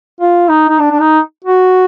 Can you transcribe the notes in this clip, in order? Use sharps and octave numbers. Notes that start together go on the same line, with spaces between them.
F4
D#4
D#4
D4
D4
D#4
F#4